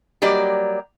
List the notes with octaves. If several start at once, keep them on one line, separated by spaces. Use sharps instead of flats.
F#3 G3 A#3 G4 D5 D#5